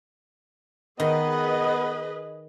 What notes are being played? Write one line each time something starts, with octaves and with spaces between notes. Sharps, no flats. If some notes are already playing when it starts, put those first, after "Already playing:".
D#3 B3 G#4 B4 D#5